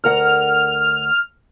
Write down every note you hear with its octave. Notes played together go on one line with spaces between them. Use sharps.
D2 A#4 F#5 F6